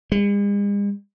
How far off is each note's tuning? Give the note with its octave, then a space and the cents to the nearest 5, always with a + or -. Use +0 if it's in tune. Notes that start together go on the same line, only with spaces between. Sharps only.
G#3 -45